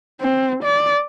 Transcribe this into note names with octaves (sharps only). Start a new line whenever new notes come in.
C4
D5